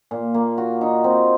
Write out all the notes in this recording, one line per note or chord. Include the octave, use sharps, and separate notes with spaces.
A#2
A#3
F#4
D#4
C4